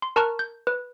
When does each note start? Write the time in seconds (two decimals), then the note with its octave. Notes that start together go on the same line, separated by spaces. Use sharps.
0.02 C6
0.16 A#4 A5 A#5 C#6 F6 F#6
0.39 G6
0.67 B4